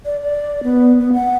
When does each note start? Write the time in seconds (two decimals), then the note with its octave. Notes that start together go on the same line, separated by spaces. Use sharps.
0.05 D5
0.23 D5
0.64 B3
1.00 B3
1.13 F#5